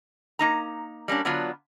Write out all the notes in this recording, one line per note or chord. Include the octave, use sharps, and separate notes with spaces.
A#3 D#4 A#5
G3 A#3 C#4 D4
D3 F#3 B3 D4 F4